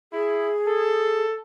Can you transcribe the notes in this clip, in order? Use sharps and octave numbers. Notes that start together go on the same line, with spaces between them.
E4 G#4
A4